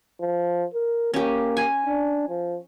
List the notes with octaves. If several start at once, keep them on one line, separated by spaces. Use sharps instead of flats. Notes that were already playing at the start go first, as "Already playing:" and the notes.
F3
A#4
A#3 C#4 G4
G#5
D4
F3